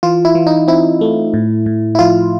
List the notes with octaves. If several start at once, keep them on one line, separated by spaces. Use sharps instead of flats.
E3 F4
E4
E3
D#4
C4 E4
A3
A2
A2
E4
F3 F4